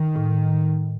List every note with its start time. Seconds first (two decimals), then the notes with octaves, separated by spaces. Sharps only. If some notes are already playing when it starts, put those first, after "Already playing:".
Already playing: D#3
0.16 A2